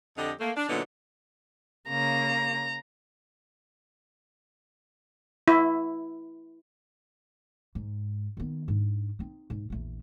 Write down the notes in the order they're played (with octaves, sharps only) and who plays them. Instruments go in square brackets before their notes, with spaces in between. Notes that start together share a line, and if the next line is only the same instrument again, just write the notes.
[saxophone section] F2 D3 G4 D#5
A3 A#3
D4
A#2 D3 E3 F#3 B3 D#4
[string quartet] C#3 A#3 [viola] A#5
[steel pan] E4
[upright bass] G#2
D#3 B3
G#2 D4
C4 D#4
G#2
A#1 E2